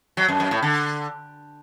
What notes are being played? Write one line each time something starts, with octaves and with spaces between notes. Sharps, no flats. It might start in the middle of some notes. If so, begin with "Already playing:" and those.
F#3
F#2
F#2
A2
D3